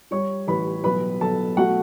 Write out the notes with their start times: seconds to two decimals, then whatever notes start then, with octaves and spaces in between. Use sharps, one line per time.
0.11 G3 C#5 C#6
0.47 A1 B4 B5
0.84 B1 B4 B5
1.21 B1 A4 A5
1.57 A3 F#4 F#5